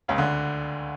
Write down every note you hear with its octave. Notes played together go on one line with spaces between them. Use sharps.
C#2 C#3
D2 D3